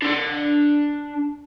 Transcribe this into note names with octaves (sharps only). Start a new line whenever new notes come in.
D4 C6